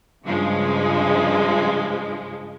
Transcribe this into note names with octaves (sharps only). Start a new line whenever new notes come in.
G2 C#3 F3 G#3